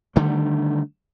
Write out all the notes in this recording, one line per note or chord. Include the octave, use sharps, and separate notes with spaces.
D3 D#3 G3 A3